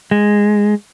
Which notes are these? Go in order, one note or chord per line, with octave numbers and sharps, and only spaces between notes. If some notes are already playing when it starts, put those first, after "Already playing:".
G#3